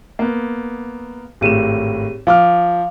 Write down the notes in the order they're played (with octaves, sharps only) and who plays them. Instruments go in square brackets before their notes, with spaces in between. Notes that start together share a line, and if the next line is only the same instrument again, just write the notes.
[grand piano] A#3 B3
[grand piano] G#1 A2 E7 [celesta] G4 G#4 D#7
[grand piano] F3 D6 F6 [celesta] F5